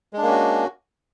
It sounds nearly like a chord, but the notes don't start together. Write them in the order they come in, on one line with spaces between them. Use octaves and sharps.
G#3 D4 A#3 C#4 F#4